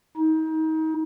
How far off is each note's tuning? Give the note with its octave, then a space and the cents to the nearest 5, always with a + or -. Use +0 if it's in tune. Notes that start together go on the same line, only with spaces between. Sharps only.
D#4 +30